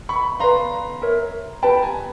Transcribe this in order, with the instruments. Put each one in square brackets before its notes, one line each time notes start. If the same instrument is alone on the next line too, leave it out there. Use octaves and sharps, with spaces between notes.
[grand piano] B5 C#6
[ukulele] B4 D5 F5 [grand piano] A#5 C6
[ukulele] A#4 C#5 E5
[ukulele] G4 B4 D5 G5 [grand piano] A5 B5
[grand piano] G#5 A#5